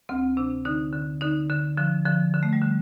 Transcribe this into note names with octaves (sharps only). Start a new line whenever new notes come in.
D2 C4
C3 D4
D3 D#4
D3
D3 D#4
D3
D3 F3
D3 F3
D3
A3
G3
D3